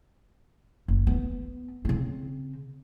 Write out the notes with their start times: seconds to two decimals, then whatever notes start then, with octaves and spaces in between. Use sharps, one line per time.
0.88 F#1
1.07 B3
1.85 C#3 C4